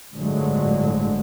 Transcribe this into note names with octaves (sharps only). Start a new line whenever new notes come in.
G1 A2 D3 F3 F#3 G#3